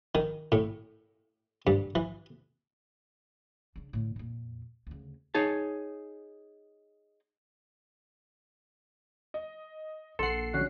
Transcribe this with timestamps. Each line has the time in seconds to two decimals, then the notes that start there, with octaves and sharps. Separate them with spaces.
0.15 D#3
0.52 A2
1.67 G2
1.95 E3
3.76 C#3 D4
3.93 A2 D3
4.16 F2 A#2
4.87 D2 C#3
5.34 D#4 G#4 C#5 A5
9.34 D#5
10.19 A#1 A4 F#5 C6 C7
10.54 D3 C#4 F#4 F#6